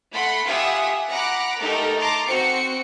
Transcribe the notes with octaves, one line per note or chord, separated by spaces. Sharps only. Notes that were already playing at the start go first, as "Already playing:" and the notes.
A3 F#5 B5 C6
F4 G4 E5 F#5 G#5 D#6
F#5 A#5 B5 D6 F#6
A3 D#4 G4 A4 A#4
A5 A#5 C6 D6
C4 F#4 C5 C#7